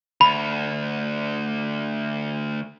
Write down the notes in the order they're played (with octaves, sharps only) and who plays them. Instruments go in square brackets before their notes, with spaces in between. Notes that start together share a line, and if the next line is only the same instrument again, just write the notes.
[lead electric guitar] D2 [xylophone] B5